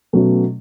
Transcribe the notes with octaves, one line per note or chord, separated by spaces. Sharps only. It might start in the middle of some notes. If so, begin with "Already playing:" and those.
B2 F#3 A3 C#4